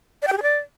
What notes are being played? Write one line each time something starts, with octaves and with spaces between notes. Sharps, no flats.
D5
G5
G4
G#4
D5